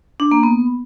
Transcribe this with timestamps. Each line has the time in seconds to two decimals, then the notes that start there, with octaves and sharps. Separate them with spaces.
0.20 D4
0.32 A#3
0.43 B3